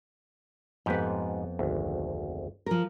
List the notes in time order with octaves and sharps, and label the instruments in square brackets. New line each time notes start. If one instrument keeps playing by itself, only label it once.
[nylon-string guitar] F2 B3 [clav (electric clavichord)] G#2 G4 B4
[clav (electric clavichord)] G#1 D2
[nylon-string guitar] F3 A#4